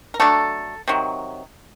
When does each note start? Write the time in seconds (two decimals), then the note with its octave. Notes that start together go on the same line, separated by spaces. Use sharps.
0.14 A#4
0.20 F#3 A3 D4 A4
0.88 C3 D#3 F#3